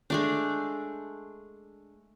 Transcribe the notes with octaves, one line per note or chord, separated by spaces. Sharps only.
G#3 A3 D4